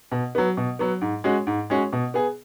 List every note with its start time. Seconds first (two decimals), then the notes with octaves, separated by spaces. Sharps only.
0.12 B2
0.35 F#3 B3
0.57 B2
0.79 F#3 B3
1.01 G#2
1.24 G#3 C#4 F#4
1.47 G#2
1.70 G#3 C#4 F#4
1.93 B2
2.14 B3 G#4